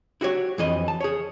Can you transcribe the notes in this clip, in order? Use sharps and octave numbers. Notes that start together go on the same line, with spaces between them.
E4 F#4 G4 C#5
F2 E3 D#5
A5
G#4 C#5